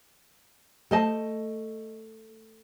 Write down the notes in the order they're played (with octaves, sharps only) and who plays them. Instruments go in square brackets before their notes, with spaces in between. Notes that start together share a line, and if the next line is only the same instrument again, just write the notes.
[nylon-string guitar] A3 [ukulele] C5 D#5 A5